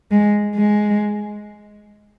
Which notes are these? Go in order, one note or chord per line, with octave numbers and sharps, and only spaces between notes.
G#3
G#3